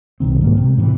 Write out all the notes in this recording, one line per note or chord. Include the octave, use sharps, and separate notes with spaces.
C2 B2 D#3 C4
G#2 A#3
C3
A2 C3 E3